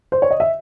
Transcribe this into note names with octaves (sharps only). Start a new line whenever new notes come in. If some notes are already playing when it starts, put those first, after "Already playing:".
C5
C#5
D#5
E5